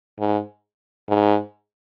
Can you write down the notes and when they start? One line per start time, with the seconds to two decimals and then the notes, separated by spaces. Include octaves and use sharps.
0.19 G#2
1.09 G#2